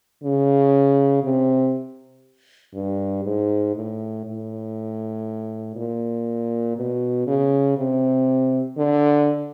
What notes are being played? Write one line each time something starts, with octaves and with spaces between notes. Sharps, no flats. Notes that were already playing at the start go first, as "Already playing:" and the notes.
C#3
C3
G2
G#2
A2
A2
A#2
B2
C#3
C3
D3